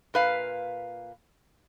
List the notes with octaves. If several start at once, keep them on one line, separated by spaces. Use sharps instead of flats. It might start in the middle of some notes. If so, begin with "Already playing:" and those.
A#2 B4 F5